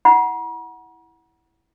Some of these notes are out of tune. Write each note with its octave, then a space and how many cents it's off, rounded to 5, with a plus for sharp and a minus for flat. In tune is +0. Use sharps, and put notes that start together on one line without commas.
E4 +0 F#5 +0 A#5 +45